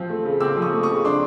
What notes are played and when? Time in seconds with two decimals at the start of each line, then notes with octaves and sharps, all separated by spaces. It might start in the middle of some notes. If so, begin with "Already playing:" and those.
Already playing: F3 C4
0.10 A3
0.25 C#3
0.41 C4 D6 E6
0.57 F3
0.62 C#6 D#6
0.73 A3
0.83 C#6 D#6
0.89 C#3
1.05 D4 C6 D6